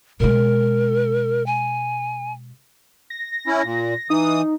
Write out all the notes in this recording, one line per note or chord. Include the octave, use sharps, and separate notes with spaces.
B2 G#3 A#4
G#5
A#6
C#4 E4
A#2
E3 D#4 D#6